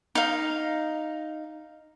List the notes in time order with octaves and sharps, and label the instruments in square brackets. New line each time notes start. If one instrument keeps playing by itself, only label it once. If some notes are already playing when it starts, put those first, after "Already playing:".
[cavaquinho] D#4 F5